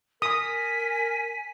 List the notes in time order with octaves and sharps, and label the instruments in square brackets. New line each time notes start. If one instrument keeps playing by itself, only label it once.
[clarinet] A#4 [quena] G#5 [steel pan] D#6 [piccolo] B6